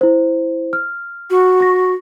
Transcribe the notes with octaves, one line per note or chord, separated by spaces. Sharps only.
E4 C5
F6
F#4
C#6 A#6